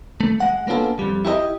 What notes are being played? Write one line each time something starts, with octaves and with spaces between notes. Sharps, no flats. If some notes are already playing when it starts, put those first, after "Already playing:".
A3
G#3 F#5
A#3 B3 C#4 D4 F4 A4
F2 G3
E4 G4 A#4 D#5